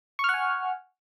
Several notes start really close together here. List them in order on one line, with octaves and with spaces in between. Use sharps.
C#6 F6 F#5 G#5